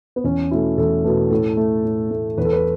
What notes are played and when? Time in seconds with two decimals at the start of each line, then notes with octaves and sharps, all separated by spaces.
0.16 B3
0.24 E2 C#4
0.51 B2 A3 E4
0.78 E2 A4
1.04 B2 A3 B4
1.30 A2 A4
1.57 A3
1.85 A2
2.11 A3
2.38 E2 B4
2.45 A4
2.53 B4